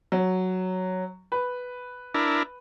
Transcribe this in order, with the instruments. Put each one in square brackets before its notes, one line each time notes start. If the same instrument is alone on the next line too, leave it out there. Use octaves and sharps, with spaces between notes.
[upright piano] F#3
B4
[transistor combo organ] D4 E4 A#4